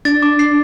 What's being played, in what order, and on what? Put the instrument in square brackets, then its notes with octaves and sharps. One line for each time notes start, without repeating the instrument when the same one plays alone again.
[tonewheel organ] D4 [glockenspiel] A6
[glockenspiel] D6
C7